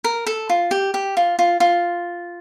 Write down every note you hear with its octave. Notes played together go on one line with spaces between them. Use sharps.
A#4
A4
F4
G4
G4
F4
F4
F4